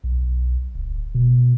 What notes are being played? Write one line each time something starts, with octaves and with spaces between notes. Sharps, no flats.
B1
D1
B2